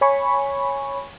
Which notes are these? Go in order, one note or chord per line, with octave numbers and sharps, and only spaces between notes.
C#5 G#5 B5 C#6